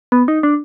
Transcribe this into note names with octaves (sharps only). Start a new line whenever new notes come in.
B3
D#4
D4